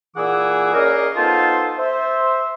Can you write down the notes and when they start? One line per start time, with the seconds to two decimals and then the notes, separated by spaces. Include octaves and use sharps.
0.17 A#2 E3 G#4 F#5 D6 E6
0.74 C#4 G#4 A#4 D5 D#5 F5
1.16 B3 D#4 F4 A4 C5 A5
1.77 C5 E5